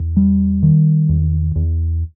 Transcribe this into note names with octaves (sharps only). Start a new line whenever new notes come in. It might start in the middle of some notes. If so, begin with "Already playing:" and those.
Already playing: E2
G3
D#3
E2
E2